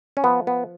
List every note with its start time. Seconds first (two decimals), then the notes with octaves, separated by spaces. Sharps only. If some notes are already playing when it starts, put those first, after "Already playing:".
0.17 C#4
0.24 F3 B3
0.47 B3